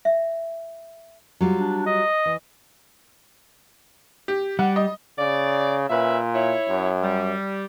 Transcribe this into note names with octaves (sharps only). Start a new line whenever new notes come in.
E5
F#3 G3 F4
D4
D#5
E3
G4
G3 F#5
D#5
C#3 D5
A#2 C#4 B4 E5
E4 C#5
F#2
G3